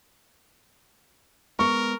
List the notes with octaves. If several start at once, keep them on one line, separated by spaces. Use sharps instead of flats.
G#3 B3 A#4 C#6